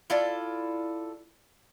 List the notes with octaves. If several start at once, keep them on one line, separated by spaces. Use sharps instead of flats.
E4 F4 A4 D5